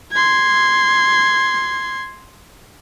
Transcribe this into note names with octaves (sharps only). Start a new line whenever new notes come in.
C6 G#6